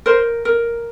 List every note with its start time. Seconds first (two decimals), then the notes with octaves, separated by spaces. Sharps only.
0.06 A#4 C5
0.45 A#4